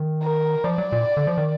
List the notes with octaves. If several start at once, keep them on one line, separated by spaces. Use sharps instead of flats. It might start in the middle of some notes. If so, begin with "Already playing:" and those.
Already playing: D#3
A#4
F3 D5
F#3
A#2
D3
F3
D#3